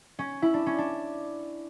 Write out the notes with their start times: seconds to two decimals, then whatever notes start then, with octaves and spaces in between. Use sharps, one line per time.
0.19 C#4
0.42 E4
0.54 D4
0.66 C#4
0.78 D4